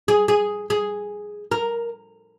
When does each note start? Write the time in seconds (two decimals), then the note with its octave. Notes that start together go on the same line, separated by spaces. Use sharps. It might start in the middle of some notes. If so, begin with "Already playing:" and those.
0.08 G#4
0.28 G#4
0.70 G#4
1.51 A#4